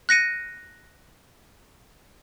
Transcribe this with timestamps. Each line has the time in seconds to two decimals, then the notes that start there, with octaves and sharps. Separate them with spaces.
0.09 F#6 A#6 C#7 D#7